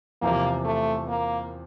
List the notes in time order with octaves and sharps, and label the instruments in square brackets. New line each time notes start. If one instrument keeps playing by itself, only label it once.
[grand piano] E2 C3 F3 [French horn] A#3
[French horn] A3
A#3